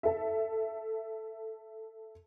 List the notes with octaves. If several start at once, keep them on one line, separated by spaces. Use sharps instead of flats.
A4 E5